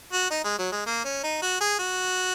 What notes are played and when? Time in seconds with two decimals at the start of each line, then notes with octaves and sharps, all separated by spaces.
0.13 F#4
0.30 D#4
0.44 G#3
0.59 F#3
0.72 G#3
0.86 A#3
1.05 C#4
1.24 D#4
1.42 F#4
1.61 G#4
1.79 F#4